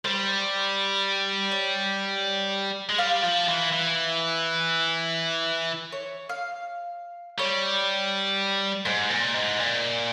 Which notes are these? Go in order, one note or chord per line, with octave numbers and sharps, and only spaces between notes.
G3 C5
C#5
G#3
G3 F5
F3
E3
E3
C#5
F5
G3 C#5
G#2 C5
A#2
G#2
A#2